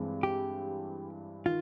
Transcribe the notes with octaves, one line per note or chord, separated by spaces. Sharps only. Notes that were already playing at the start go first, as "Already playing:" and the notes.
Already playing: G2 E3 G#3 C4
G4
D#3 F4